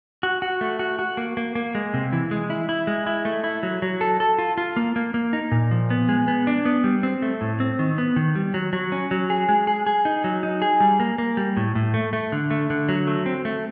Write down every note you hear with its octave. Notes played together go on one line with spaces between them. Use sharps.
F#4
F#4
A3
F#4
F#4
A#3
A#3
A#3
G#3
C3
E3
G#3
E4
E4
G#3
E4
A3
E4
F#3
F#3
A4
A4
F4
F4
A#3
A#3
A#3
D#4
A#2
F3
B3
G#3
B3
D4
B3
G3
C4
A3
A2
C4
D#3
B3
D#3
G3
F#3
F#3
C#4
F#3
G#4
G#3
G#4
G#4
D#4
F#3
D#4
G#4
G3
A#3
A#3
G3
A2
A2
A3
A3
D3
A3
D3
F#3
A3
C4
A3